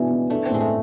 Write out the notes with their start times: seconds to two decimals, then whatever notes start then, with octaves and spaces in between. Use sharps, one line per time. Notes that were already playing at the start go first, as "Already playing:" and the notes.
Already playing: B2 E3 G#3 D4
0.10 B3
0.30 A3 D4
0.45 C4
0.51 A2 G#3
0.61 A3